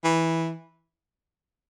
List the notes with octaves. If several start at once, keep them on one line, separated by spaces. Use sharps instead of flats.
E3